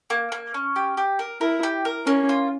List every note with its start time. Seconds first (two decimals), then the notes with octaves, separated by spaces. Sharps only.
0.10 A#3
0.32 A#3
0.54 C#4
0.76 G4
0.97 G4
1.19 A#4
1.41 E4 A#4
1.63 G4
1.85 A#4
2.06 A#3 C#4
2.29 F4